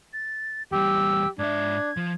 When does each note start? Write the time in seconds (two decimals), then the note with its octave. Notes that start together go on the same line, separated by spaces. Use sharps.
0.13 A6
0.72 E2 G3 G4 E6
1.39 G#2 D4 E5 G#6
1.97 F3